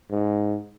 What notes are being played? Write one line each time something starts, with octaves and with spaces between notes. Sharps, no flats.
G#2